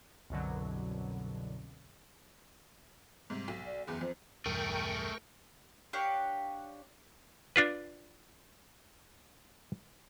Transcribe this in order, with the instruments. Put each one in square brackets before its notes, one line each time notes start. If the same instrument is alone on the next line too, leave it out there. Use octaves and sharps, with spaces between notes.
[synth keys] C2 F#2 B2 D3 F#3
[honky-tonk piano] G#2 C3 [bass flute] G3
[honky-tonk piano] B1 [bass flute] F#3
[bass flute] D5
[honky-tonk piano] F#1 E2 [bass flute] G#4
[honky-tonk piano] F2 [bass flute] C5
[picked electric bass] B1 E2 G2 [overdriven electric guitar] A3 G#4 [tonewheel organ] A#4 G5 C#6
[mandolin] D4 G4 C#5 F5
[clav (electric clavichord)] D4 F4 B4